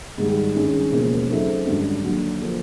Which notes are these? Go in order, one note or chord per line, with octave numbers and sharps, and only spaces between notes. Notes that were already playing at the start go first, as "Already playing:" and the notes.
G#2 D#3 G3
G2 D#3 G#3 C#4
E1 D#2 C#3 F3 A#3
C#3 F#3 A3 C4 D#4
G#1 F#2 D3 G3
D#2 D3 F#3
D3 F3 A#3 D4